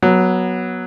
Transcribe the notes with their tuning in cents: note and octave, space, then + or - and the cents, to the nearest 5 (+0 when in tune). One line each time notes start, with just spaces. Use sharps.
F#3 +0 B3 -20